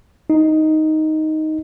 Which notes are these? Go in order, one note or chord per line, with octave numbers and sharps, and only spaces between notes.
D#4